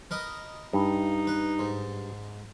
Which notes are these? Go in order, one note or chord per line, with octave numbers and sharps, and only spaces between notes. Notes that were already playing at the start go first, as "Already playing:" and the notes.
A#4 B4 D#5
G2 D#4
B4
G#2